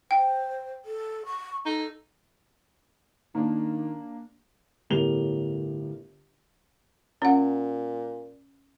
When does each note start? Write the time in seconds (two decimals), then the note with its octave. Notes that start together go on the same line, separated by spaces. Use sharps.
0.11 C5 G5
0.85 A4
1.26 C#6
1.66 D#4 A4
3.35 D#3 A#3 D4
4.90 G1 A2 G4 A#4 F7 G7
7.22 A#2 C#4 F#5